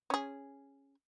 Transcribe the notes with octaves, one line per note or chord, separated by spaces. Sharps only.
C#4 G#4